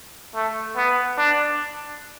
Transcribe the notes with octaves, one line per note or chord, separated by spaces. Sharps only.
A3
B3
D4